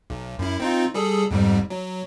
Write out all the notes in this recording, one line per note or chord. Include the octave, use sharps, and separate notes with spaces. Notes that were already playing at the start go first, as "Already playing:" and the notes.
B1
F#2 E4
C4 D#4 F4
G3 G#4 A4
F2 G#2 G3
F#3